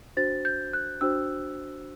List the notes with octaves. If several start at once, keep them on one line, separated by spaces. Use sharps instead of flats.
D4 F#4 C5 A6
G6
F#6
D4 F#4 C5 E6